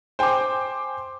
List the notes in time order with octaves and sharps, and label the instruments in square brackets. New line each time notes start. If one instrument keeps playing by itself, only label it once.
[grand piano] C5 G5 G#5 C6 D6